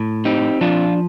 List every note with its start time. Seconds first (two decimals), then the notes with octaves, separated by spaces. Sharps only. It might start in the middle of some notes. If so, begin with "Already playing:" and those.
Already playing: A2
0.25 C4 D#4 G4
0.61 F3 D4 F4